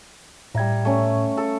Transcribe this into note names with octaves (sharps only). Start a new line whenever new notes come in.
A2 G3 E5 A#5 G#6
A3 C#4
A4